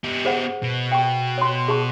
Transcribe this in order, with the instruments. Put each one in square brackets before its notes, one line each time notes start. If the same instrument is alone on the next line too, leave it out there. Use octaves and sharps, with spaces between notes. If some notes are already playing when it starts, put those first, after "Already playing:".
[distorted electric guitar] B3 G4
[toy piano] G#4 C5 F#5
[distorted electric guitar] B2
[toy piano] G5 C#6
C#5 C6
G#4 A5 C#6